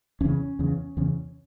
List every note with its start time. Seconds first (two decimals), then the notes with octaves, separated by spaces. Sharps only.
0.21 E2 C#3 C#4
0.59 E2 C#3
0.97 E2 C#3